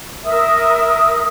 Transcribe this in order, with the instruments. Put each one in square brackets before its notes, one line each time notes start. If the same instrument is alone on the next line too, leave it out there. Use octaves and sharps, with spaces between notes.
[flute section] A#4 E5 D#6